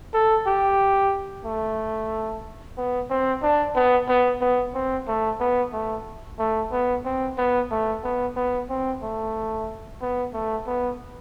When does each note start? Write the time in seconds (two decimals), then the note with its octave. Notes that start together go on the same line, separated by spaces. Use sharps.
0.14 A4
0.47 G4
1.45 A3
2.77 B3
3.10 C4
3.43 D4
3.75 B3
4.09 B3
4.41 B3
4.74 C4
5.08 A3
5.40 B3
5.73 A3
6.39 A3
6.72 B3
7.05 C4
7.38 B3
7.71 A3
8.04 B3
8.37 B3
8.69 C4
9.02 A3
10.01 B3
10.34 A3
10.67 B3